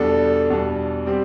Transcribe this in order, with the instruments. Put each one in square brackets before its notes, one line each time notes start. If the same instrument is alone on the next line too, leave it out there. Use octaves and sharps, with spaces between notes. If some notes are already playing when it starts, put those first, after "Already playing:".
Already playing: [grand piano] E2 B2 G3 D4 [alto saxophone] A4
[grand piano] E2 B2 G3 D4
G3 C4 G4